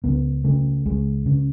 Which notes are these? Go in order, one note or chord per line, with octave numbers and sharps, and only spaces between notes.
C#2 B3
C#3 A3
C#2 G#3
C#3